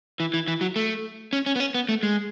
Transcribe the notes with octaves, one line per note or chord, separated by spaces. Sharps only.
E3
E3
E3
F#3
A3
C#4
C#4
B3
C#4
B3
A3
G#3